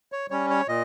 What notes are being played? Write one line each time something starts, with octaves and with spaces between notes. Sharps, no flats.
C#5
G3 C#4 C#5
C#5
A#2 D#5